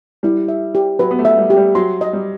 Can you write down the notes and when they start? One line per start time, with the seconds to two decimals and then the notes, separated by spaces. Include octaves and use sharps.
0.23 G3 E4
0.48 E5
0.75 G4
0.99 F#3 B4
1.11 B3
1.19 A3
1.25 E5
1.38 G3
1.50 G4
1.57 G3
1.75 F#3 C6
2.01 D#5
2.13 G3